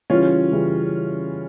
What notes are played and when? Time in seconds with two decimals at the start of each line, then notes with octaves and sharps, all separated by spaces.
0.10 C#3 E3 G3 C#4 F4
0.52 C#3 E3 G3